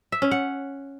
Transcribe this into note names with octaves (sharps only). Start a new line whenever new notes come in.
E5
C#4
F#5